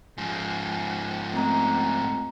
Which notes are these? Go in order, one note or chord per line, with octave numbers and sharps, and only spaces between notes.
G#2 F3
A3 C4 A#5